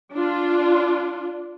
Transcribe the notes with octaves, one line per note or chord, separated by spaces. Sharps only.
D4 F4